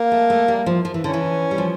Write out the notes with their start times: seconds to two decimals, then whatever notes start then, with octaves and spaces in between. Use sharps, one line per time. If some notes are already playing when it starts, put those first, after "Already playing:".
Already playing: A#3
0.12 A3
0.30 A3
0.48 G3
0.66 F3
0.85 F3
0.94 E3
1.02 D3 C#4
1.13 E3
1.51 G3
1.58 F3